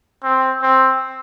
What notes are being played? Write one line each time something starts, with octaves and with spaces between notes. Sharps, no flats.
C4
C4